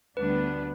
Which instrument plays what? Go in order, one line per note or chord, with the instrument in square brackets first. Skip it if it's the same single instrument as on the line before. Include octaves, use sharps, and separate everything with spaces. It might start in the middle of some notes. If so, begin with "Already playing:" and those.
[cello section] D2 D3 G3 B3 D4 [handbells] B4